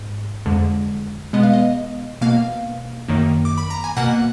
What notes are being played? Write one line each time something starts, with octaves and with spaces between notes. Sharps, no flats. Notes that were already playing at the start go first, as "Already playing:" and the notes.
Already playing: G#2
F2 D3 G#3
B2 G#3 B3 D#5
F5
D#5
B2 A#3 F5
F#2 D#3 A#3
D6
B5
A#5
G#5
B2 A#3 F#5